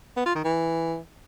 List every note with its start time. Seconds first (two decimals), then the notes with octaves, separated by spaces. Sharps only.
0.17 B3
0.26 F4
0.35 D#3
0.45 E3